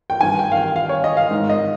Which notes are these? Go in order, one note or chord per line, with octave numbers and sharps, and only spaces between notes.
G5
G2 D#3 G#5
G5
F5
G5
F5
C#5
D#5
F5
G#2 D#3
D#5